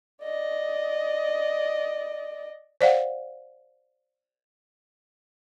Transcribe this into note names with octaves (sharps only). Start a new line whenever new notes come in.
D5 D#5
C5 D5 F5 F#5